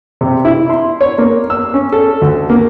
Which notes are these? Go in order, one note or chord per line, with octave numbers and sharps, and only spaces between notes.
C3
E4
C6
C#5
A#3
E6
C#4
A4
D2
A#3